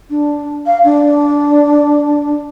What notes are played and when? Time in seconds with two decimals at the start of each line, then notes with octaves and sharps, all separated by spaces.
0.10 D4
0.66 F5
0.84 D4